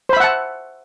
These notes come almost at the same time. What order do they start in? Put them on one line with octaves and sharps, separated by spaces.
C5 B5 E5 F#5 A5